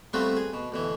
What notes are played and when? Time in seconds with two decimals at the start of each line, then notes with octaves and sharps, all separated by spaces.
0.13 G3 A3 B3 C4 F4 F#4
0.37 G#4
0.53 B2
0.72 D2 B2 E3